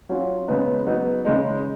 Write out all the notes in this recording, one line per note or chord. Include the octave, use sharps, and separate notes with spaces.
F#3 C#4 F4
C#3 G#3 B3 D#4
F#3 B3 D#4
C#3 G#3 D#4